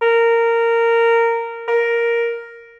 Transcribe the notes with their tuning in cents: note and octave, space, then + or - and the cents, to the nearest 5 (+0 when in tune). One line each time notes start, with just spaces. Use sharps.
A#4 -15
A#4 +5